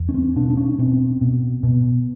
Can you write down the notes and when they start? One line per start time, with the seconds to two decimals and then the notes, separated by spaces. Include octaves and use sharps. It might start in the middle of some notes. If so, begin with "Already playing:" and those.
Already playing: E2
0.09 C#4
0.14 C4
0.36 B2 D4
0.50 D4
0.57 C#4
0.78 B2 C4
1.21 B2
1.63 B2